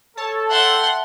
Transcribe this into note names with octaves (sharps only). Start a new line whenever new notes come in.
A4 C#5 A5
E5 F#5 G5 A5 C6